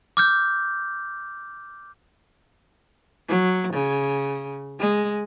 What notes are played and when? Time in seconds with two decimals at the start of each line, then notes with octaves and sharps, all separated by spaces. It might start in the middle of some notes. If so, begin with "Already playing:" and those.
0.17 D6 F6 G6
3.29 F#3
3.74 C#3
4.79 G#3